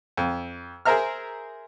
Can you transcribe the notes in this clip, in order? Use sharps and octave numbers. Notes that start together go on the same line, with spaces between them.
F2
G#4 A#4 C5 E5 A#5 F6